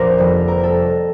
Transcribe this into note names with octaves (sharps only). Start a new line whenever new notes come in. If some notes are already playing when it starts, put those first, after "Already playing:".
Already playing: F1 A#1 A#4 C5 D5
F2 C3 G3
A#4
A4